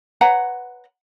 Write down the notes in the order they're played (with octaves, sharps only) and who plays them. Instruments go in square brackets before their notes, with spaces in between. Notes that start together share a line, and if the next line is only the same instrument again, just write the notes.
[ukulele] B4 C#5 F#5 A#5